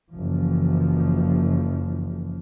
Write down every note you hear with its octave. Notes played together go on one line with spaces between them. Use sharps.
F#1 E3 F3